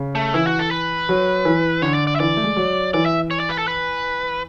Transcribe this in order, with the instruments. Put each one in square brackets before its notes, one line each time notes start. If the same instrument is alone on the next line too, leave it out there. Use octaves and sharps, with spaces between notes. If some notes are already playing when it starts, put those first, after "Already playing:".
Already playing: [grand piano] C#3
[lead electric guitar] A3
[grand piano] E3 [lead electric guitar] E4
[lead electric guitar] F#4
A4
B4
[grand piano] F#3
E3
[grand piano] D3 [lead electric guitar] C#5
[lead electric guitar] D5
D5
E5
[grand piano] E3 [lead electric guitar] D5
[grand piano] A3
G#3
F#3
[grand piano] E3 [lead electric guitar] D5
[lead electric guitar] E5
C#5
D5
B4
A4
B4